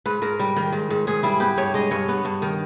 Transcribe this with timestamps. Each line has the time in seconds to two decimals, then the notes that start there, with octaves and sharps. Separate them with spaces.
0.05 G#2 B4
0.22 G#2 A#4
0.39 G3
0.56 D#3
0.72 G#2
0.90 G#2
1.07 G#2 G#4
1.23 G3 E4
1.40 B3 G4
1.58 G2 C#5
1.74 G#3 D#5
1.91 G2 C#5
2.08 B3
2.25 G2
2.42 D#3